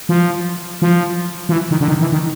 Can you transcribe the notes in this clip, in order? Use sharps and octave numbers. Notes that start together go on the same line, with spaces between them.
F3
F3
F3
E3
D#3
D3
D#3
E3
D#3